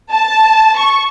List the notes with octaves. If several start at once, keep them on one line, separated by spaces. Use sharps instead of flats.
A5
C#6